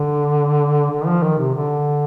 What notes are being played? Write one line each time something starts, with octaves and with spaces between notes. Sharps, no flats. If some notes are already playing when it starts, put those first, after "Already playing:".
Already playing: D3
D3
F3
D#3
C3
D3